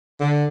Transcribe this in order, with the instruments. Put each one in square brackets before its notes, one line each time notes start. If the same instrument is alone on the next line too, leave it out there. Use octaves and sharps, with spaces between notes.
[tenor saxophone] D3